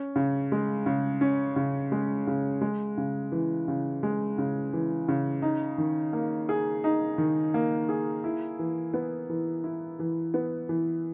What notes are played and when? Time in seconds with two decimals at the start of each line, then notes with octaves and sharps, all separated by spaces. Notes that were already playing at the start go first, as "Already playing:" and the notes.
Already playing: C#4
0.16 C#3
0.52 G#3
0.86 C#3
1.21 C#4
1.56 C#3
1.92 G#3
2.27 C#3
2.61 G#3
2.98 C#3
3.32 E3
3.68 C#3
4.03 G#3
4.38 C#3
4.73 E3
5.08 C#3
5.42 D#4
5.78 D#3
6.13 A#3
6.49 G#4
6.84 D#4
7.18 D#3
7.54 A#3
7.89 G#4
8.24 E4
8.59 E3
8.94 B3
9.29 E3
9.64 E4
9.99 E3
10.34 B3
10.69 E3